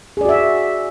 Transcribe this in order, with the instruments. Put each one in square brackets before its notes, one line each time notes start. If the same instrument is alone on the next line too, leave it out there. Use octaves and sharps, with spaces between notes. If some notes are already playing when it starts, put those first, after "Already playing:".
[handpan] G#4
D5
F#4
E5